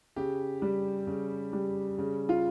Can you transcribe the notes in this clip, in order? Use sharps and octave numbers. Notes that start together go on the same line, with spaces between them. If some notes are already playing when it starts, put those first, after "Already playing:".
C#3 G4
G3
C#3
G3
C#3
F4